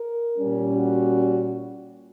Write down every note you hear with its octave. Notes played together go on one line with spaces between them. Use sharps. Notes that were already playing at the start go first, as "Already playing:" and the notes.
Already playing: A#4
A#2 G3 C#4
F#4